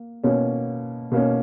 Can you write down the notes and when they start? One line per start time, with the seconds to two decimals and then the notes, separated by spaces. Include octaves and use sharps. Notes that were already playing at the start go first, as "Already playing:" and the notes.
Already playing: A#3
0.24 B2 A#3 C#4
1.12 B2 A#3 C#4